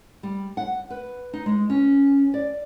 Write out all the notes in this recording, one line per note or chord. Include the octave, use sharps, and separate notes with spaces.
G3
F#5
B4
D#4
G#3
C#4
D5